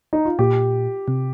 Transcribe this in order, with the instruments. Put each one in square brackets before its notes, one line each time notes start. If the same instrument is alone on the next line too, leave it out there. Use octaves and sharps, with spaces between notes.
[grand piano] D#4
F4
[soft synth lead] A#2 [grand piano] G4
[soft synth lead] C3